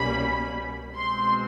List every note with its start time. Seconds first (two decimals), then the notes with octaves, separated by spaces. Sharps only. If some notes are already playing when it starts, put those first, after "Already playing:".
Already playing: C2 B2 G3 A#3 C#4 B5
0.95 B2 G#3 C4 C6